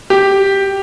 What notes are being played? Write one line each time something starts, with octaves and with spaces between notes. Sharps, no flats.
G4